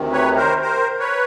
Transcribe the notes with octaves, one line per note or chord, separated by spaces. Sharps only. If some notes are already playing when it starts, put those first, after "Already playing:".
Already playing: D2 C3 D#3
B4 C#5
A#4 C5
A#4 C5
B4 C#5